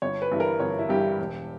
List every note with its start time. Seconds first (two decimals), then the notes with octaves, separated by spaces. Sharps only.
0.02 G1 C#5
0.22 B4
0.31 G2 E3 G3
0.40 A#4
0.60 G1 C#5
0.79 E4
0.89 G2 E3 G3 G4
1.18 E1